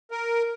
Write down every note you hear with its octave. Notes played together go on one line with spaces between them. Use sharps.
A#4